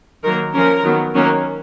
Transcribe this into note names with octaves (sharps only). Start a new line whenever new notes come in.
D#3 F#3 A#3 A#4
F3 A#3 C#4 A#4
D#3 F#3 B3
D#3 F#3 A#3 C#4